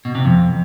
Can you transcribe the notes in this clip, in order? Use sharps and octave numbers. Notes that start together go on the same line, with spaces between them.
B2
C3
F2